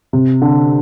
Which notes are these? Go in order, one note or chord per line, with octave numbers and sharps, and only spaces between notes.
C3
D3